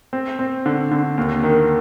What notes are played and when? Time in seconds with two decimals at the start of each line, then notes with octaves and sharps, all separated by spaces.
0.13 C4
0.39 C4
0.66 D3
0.91 D3
1.18 D#2
1.44 D#3